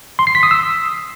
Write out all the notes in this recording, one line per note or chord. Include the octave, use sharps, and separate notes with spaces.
C6
C7
B6
D#6
E6